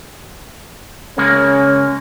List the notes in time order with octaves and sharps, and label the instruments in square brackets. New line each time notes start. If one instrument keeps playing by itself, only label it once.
[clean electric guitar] C#3 G#3 A#3 [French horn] C#4